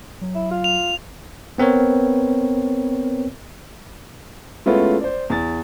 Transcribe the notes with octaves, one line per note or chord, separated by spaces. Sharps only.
F#3
E4
F4
F7
B3 C4 A#4 B4 C#5
G#3 A3 B3 C#4 E4 F4
C5 D5
E2 A6